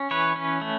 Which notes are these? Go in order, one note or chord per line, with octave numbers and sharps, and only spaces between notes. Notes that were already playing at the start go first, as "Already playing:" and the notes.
Already playing: C#4
E3 B4 C#5
C#4
A3